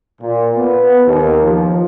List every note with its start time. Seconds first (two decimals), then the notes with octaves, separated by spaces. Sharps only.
0.22 A#2
0.57 B3
1.06 D#2
1.43 F3